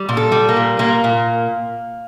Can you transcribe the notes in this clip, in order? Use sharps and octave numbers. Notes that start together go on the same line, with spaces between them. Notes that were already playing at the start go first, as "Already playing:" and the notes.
Already playing: G3
A#2
A4
G3
A#3
A#2
A#2 A#3
A#2